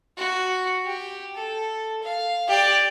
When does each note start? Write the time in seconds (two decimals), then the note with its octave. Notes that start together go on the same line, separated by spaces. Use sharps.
0.17 F#4
0.86 G4
1.36 A4
2.03 F5
2.48 G4 D5